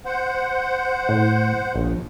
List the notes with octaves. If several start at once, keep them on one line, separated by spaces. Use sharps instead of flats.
C5 F#5
A2
A#1 D#2